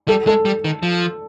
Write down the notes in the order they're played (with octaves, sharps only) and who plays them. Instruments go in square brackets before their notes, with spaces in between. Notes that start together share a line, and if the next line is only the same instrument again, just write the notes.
[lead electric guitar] G3 [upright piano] A4
[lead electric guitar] G#3 [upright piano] A4
[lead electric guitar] G3
D#3
F3